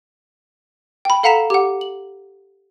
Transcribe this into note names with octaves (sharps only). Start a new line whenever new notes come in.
G5 B5
A4 F5 F#5 A#5 B6 E7
G4 F#5
F#7